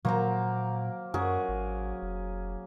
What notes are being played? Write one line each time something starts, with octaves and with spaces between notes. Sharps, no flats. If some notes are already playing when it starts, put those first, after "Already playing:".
A#2 F#3 A#3 C5 A#5
F#2 C#4 F#4 G#4 A#4
G#1
F1